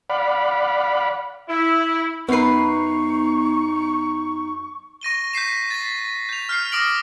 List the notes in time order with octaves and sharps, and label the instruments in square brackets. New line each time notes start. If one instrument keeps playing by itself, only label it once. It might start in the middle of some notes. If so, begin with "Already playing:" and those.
[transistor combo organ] D5 F5 F#5 B5
[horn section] E4
[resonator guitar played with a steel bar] F#2 B4 [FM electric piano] B3 C7 [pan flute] D#4 [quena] C#6
[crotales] C#6 A#6 D#7 G7
G6 B6 C7 E7
A6 B6
G6 F7
F6 G6 C7
D6 D#6 A#6 D7 F#7